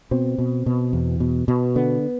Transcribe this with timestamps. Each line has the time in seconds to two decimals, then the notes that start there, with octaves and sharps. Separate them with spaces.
0.11 B2 C4
0.38 B2
0.66 B2
0.93 E2
1.20 B2
1.48 B2
1.76 D3 B3